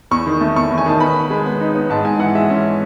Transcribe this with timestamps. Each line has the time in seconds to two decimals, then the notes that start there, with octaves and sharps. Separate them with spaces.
0.11 E2 C#6
0.27 D#3
0.41 A3
0.56 E2 C#6
0.70 E2
0.78 G#5
0.86 D#3 A5
1.00 B3 B5
1.15 B3
1.30 G#3
1.46 B3
1.61 D#4
1.75 B3
1.90 G#2 A5
2.05 G#2 G#5
2.19 E3 F#5
2.35 G#3 E5
2.50 C#4